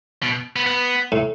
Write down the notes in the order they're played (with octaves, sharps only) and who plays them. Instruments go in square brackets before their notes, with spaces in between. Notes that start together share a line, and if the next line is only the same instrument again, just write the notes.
[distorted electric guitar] B2
B3
B3
[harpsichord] A2